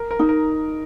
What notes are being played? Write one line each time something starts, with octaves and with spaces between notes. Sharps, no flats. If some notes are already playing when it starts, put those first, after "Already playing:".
Already playing: A#4
A#4
D#4
A#4